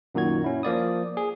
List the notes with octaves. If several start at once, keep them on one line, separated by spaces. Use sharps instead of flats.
F#2 A#2 D#3 F#4 G#6
C#4 E4
F3 A#3 D5 D#6
G#4